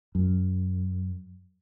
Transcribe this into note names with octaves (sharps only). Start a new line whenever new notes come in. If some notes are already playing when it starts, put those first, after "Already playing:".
F#2